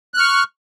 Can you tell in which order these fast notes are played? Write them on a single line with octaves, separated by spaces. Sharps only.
F#6 F6 C#6